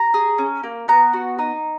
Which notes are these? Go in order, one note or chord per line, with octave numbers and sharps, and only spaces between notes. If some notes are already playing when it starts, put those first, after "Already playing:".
Already playing: A#5
G#4
C#4
A#3
B3 A#5
F#4
D#4